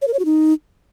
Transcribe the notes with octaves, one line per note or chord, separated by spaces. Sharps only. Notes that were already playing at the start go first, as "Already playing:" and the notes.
C#5
A#4
C#5
F#4
D#4